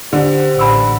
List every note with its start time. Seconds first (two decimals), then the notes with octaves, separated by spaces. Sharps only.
0.13 D3 G4 C5
0.59 A1 G#5 B5 E6